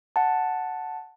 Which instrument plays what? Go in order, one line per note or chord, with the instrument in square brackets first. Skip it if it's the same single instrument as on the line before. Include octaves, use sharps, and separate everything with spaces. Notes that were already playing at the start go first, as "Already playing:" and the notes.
[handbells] F#5 A5